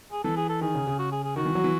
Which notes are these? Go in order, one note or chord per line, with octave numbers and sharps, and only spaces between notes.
G#4
E3 A4
G#4
A4
D#3 G#4
C#3
C#3
F#4
G#4
G#4
D#3 F#4
E3
F#3
E3